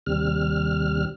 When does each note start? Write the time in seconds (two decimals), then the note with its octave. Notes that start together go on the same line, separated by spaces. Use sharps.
0.06 D#2 C3 G3 F6